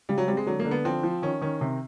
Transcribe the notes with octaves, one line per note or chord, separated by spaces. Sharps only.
C#3 G3
F#3
G3 C4
G#3
D3 F#3
A#3
D3
B3
F3 C4
F3
D#3 C#4
D#3 C#4
C3